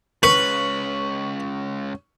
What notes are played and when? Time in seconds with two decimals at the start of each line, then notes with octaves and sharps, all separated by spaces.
0.23 G#3 C#4 B4 C#6